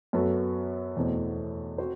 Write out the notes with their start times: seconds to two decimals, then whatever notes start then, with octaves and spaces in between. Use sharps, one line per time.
0.13 F#2 F#3 B3 F#4 A4
0.97 E2 B2 A3 C4
1.78 C4 F#4 C5